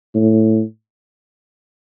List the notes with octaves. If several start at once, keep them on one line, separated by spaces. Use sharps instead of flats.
A2